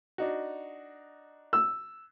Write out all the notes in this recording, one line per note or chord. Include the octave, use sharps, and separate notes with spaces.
D4 D#4 F#4
E6